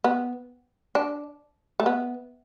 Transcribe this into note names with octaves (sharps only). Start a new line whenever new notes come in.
B3
D4
A3
B3